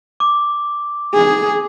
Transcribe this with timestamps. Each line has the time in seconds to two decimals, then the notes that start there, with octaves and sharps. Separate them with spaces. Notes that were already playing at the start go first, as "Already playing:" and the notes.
0.20 D6
1.14 G#4